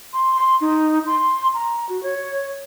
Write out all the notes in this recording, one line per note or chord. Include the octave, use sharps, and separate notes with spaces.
C6
C6
D#4
C6
A#5
F#4
C#5